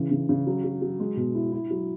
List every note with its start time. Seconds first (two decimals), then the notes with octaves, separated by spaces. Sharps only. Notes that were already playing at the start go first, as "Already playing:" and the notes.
Already playing: C#3 E3
0.11 C#3
0.29 C#3
0.47 F#3
0.64 F#3
0.82 F#3
1.00 G#3
1.17 B2
1.35 E4
1.53 E4
1.71 F#3